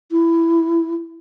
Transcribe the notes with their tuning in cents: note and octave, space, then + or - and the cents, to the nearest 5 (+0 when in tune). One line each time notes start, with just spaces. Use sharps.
E4 +15